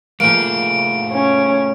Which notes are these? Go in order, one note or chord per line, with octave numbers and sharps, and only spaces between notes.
F3 A3 A#3 E4 G#4 D7
C#4